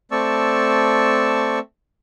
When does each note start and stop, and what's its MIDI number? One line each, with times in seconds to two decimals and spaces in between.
0.11 1.59 57
0.11 1.59 60
0.11 1.59 74
0.11 1.59 81
0.11 1.59 85
0.11 1.59 88